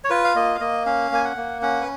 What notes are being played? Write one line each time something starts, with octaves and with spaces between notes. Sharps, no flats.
C#5
F4 B4
F5
A#3 D#5
F5
A#3 D#5
C#4 F5
A#3 G#5
F#5
A#3
C#4 F#5
B4